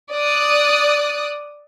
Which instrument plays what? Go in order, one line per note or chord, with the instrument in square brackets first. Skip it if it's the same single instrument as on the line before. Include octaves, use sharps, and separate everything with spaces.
[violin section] D5 D#6 F#6